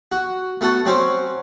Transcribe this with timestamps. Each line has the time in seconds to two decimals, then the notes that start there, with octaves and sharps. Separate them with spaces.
0.12 F#4
0.61 A3 B3 F#4 A4
0.85 F#3 C4 C#4 C5